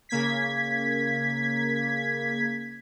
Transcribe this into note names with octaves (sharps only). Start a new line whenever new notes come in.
C#3 A#3 G#6 B6